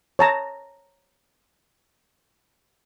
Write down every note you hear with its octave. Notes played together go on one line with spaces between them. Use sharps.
C#5 A5 A#5